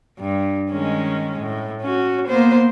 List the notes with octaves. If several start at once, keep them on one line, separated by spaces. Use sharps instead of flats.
G2
D#3 G#3 C#4
A2
C#4 F#4
A#3 B3 C5